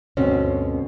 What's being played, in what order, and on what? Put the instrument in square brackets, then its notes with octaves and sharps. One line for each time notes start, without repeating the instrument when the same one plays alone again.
[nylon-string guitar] D2 G2 B2 C4 C#4